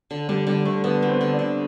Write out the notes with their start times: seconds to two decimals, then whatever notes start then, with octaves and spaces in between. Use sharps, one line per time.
0.11 D3
0.29 D3 G3
0.47 D3 G3
0.65 D3 A3
0.84 D3 B3
1.02 B3
1.09 C4
1.21 D3
1.33 D4
1.39 D3